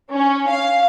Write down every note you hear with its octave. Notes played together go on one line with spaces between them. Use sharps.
C#4
F5